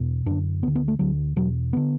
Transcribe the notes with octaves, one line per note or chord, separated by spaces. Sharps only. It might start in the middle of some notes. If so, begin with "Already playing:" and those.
Already playing: E2 B2
F#2 D3 D4
D2 D3 B3
B3
A3
D2 D3 F#3
E2 B2 F#3
D3 B3